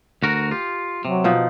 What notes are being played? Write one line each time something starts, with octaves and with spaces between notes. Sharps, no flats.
D2 F#4 A#4
F4 G4
C3 F#3
B2 F3 D#4